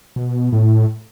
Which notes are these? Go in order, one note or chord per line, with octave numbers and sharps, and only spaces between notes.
B2
A2